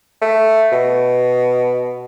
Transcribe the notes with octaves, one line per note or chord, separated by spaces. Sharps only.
A3
B2